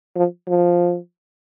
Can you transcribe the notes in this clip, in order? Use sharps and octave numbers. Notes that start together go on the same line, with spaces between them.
F3
F3